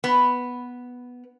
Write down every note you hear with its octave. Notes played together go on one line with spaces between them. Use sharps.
B3